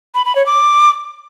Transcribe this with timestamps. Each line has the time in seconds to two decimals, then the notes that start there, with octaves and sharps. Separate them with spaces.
0.15 B5
0.25 B5
0.36 C#5
0.46 D6